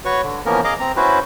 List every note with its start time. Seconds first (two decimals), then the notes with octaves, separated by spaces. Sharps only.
0.05 F#4 B4 C#5 C#6
0.23 D3
0.46 E3 F3 A#3 B3 C#4 A#4
0.64 G#4 D#5 F5 A#5 D6
0.80 C4 A#5
0.97 C#4 E4 F#4 B4 C5